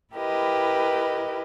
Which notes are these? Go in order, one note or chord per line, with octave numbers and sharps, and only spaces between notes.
E4 G4 A#4 B4 D#5